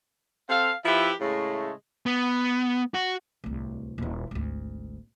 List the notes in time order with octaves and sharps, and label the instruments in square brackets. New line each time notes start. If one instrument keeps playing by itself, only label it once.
[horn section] C4 A4 F5
F3 E4 G4 B4 E5
A2 C#3 G#3 A3
[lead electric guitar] B3
F#4
[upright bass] D1 C2
D#1 E4
G#1 D2